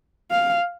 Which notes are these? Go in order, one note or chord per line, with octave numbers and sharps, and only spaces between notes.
F5